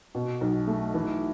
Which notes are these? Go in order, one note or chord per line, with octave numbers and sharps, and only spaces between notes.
B2
B1
A3
E3